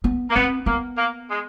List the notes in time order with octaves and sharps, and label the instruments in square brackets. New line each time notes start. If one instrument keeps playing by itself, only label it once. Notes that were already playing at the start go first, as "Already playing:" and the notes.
[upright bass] B3
[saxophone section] A#3
[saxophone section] B3 [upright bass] C4
[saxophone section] A#3 [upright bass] B3
[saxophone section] A#3
G#3